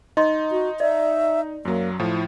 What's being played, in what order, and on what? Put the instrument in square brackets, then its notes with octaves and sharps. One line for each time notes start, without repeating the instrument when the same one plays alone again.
[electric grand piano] D#4 [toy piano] D#5 C6
[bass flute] F#4
[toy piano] D5 [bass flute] E5
[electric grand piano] F#2 F#3 [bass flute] A#3
[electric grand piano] A2 F3 [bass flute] E4